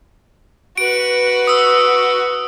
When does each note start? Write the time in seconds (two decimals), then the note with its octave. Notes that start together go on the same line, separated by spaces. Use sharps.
0.78 F#4 B4 D7
1.47 D#6 E6